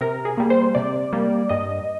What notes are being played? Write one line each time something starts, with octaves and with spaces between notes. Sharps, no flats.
C3 A#4
G#4
G3 A#3
C5
C3 D5
G3 A#3
G2 D#5